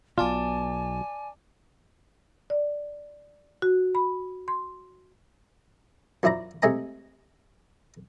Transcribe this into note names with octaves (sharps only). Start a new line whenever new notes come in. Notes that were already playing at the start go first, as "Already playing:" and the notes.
B1 B2 F4 D5 G#5 A5 D6
D5
F#4
B5
C6
F#2 F3 E4 D5 A#5
C3 G#3 A3 D#5 G#5 A#5